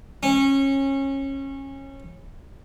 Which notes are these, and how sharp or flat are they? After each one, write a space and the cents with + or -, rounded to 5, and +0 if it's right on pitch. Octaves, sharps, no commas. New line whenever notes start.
C#4 -25